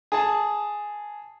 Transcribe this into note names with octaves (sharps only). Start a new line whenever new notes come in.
G#4 A5